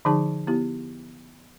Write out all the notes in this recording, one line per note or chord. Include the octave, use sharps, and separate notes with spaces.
D3 F3 D#4 G#4 A5
B3 E4 G4